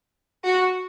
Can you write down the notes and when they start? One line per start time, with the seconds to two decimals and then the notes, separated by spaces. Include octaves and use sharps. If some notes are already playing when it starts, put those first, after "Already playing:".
0.46 F#4